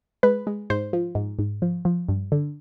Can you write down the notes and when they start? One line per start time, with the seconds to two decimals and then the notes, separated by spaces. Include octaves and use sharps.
0.23 G#3 B4
0.47 G#3
0.70 G#2 C5
0.93 F3
1.15 G#2
1.39 G#2
1.62 F3
1.85 F3
2.09 G2
2.32 D3